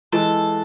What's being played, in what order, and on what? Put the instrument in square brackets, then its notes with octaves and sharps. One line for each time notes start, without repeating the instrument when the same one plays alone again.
[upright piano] E3 G#3 [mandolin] A4